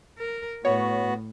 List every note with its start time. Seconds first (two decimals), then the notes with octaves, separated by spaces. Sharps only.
0.18 A#4
0.65 A2 B3 F#4 C#5